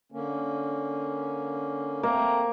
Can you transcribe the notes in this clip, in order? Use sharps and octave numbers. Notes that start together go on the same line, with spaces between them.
D3 A#3 C#4
A3 A#3 C4 A#5